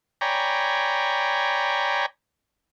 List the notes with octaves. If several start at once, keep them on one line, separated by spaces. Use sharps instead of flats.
C#5 D5 G5 G#5 A#5 B5